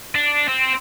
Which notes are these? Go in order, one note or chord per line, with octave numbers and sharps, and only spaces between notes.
D4
C4